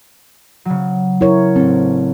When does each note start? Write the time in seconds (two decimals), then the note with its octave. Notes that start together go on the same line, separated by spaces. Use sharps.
0.65 C#3 F#3
1.21 E4 A#4 C#5
1.56 A1 C4 A4